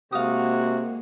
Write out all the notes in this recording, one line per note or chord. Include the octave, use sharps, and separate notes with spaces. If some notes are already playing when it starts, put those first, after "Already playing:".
C3 G#3 A#3 F#4 F5 D#6